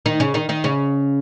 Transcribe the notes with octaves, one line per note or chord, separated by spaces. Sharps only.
D#3 D#4
C#3 C#4
D#3 D#4
D#3 D#4
C#3 C#4